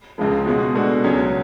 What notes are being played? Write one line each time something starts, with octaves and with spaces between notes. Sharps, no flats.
C#2 C#3 F3 G#3
B2 G#3 B3 F#4
B2 G#3 D4 F#4 A4
C#2 C#3 F#3 C#4